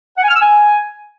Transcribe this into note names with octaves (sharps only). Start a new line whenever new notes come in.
F#5
G#5
F6
E6
G#5